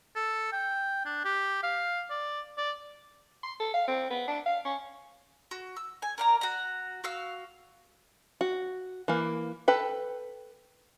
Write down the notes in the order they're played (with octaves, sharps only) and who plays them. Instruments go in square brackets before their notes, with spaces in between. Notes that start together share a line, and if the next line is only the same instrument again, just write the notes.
[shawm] A4
G5
D4
G4
F5
D5
D5
[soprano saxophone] C6
A4
F5
C4
B3
D4
F5
C#4
[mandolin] F#4
E6
G#5
A#4 D5 A#5
F#4 A#5
F#4 F5 E6
[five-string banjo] F#4
E3 A#3
A4 B4 G5